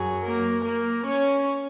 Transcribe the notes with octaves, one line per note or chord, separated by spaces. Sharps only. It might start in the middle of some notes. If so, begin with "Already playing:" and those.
Already playing: F#2 F#3 G#4
A#3 A#4
A#3 A#4
C#4 C#5